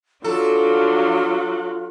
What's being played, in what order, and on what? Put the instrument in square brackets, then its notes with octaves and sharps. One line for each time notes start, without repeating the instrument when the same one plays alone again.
[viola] F#3 [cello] D4 [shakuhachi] F4 [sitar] A4